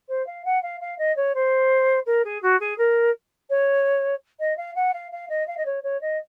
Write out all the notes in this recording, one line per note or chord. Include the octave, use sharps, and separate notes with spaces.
C5
F5
F#5
F5
F5
D#5
C#5
C5
A#4
G#4
F#4
G#4
A#4
C#5
D#5
F5
F#5
F5
F5
D#5
F5
D#5
C#5
C#5
D#5